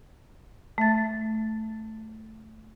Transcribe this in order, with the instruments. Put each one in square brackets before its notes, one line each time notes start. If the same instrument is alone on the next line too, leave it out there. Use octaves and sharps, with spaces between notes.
[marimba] A3 E5 A6